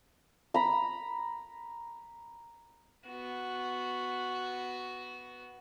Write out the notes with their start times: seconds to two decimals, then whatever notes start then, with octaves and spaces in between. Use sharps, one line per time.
0.54 A#5 B5
3.08 B3 F#4